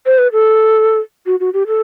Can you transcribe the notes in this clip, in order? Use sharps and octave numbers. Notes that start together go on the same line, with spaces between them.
C5
B4
A4
F#4
F#4
G4
A4